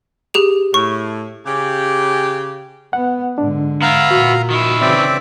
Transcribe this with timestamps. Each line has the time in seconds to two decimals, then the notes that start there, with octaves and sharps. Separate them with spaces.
0.34 G4 G#4 F7
0.74 A2 C#6
1.46 C#3 G4
2.93 B3 F#5
3.38 G#2 D3 D4
3.82 B3 E4 F5 A#5
4.11 A#2 F#4
4.50 D#3 E4
4.81 C#3 E3 C4 D5 E5